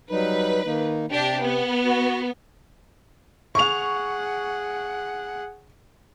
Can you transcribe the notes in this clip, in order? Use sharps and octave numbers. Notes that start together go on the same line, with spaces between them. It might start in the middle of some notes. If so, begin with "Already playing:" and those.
F#3 G3 D#4 B4
D#3 A#3 D#4
C3 D4 G4
B3
F#4
G#4 F#5 C#6 F7